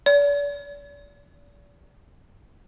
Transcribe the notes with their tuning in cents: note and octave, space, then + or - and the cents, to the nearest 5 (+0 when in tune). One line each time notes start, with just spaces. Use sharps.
D5 -40